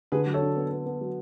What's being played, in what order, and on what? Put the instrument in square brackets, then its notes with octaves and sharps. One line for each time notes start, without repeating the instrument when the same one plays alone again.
[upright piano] D3 [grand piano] G#4 B4
[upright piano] F#3
[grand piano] A4 C#5
[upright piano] D4
B3
B3
B3
F#3